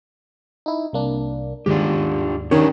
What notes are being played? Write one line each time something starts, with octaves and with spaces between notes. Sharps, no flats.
D#4 E4
C2 A#3 D4
D#2 G#2 D4 F4 G4
D#3 C#4 D4 G4 C#5